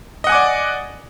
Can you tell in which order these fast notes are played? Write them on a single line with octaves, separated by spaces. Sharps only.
D#5 F#5 G#5 D6 D5